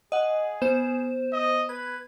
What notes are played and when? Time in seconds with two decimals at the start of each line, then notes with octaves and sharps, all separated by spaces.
0.12 G#4 D#5 F#5
0.62 B3 C5 E7
1.33 D#5
1.69 B4 G#6